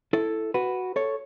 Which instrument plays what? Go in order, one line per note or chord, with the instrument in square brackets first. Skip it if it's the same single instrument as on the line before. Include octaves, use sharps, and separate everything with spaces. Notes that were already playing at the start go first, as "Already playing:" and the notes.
[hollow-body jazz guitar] E4 A4
F#4 B4
A4 C#5